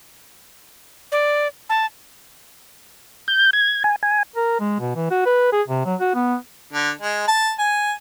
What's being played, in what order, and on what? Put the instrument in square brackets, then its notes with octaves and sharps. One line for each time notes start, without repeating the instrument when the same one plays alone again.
[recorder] D5
A5
[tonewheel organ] G6
G#6
G#5
G#5
[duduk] A#4
G#3
B2
E3
F#4
B4
G#4
C3
F#3
F#4
B3
[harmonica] D3
G#3
A5
G#5